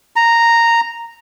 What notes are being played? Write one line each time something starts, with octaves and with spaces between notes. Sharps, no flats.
A#5